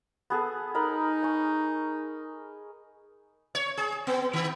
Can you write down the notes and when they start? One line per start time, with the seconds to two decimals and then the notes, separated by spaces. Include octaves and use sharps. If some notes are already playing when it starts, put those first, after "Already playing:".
0.30 B3 G#4 A4
0.75 D#4 A#4 D#5 B5
1.23 G#5 C#6
3.55 C#5
3.77 G#4
4.07 B3
4.33 D#3